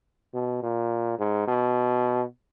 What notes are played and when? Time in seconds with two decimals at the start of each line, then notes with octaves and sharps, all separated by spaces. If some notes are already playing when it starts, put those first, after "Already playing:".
0.34 B2
0.63 A#2
1.19 G#2
1.48 B2